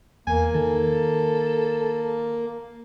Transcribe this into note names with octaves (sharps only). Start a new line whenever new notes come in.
E2 A#3 G#5
D#3 A4